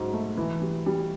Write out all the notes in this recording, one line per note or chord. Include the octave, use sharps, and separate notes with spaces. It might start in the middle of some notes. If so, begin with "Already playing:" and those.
Already playing: G#2 F#3
A3
E3
G3
G3